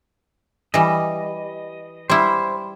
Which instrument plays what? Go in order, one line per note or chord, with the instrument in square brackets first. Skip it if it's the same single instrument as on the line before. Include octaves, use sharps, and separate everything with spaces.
[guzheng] E3 G3 [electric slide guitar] D#5
[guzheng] G3 E4 [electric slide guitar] C5